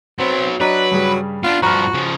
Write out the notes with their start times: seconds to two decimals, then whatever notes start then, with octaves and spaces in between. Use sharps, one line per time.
0.19 F#3 B3 C4
0.60 F#3 D4 B4 D#5 A#5
0.91 G2 C#3 G3
1.43 B3 D4 F4
1.62 G2 F3 F#4 A#5 B5 F6
1.94 C#3 F3